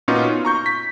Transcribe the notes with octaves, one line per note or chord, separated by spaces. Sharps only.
A#2 B3 C#4 D#4 F4 F#4
F4
A#5 C#6 G6
B6